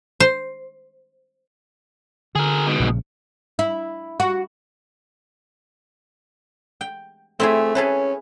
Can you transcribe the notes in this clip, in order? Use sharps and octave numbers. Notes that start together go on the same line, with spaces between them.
C5
D3 G#4 A#4
G#2 B2
A#1 C#3
E4
F#4
G5
A3 C4 E4 G#4
C#4 G#4 A4 B4